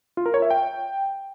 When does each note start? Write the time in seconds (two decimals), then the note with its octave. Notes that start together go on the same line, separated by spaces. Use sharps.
0.17 F4
0.26 A#4
0.34 C#5
0.42 E5
0.51 G5